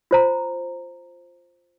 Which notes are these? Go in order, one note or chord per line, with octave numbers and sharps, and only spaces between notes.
F4 C5 A#5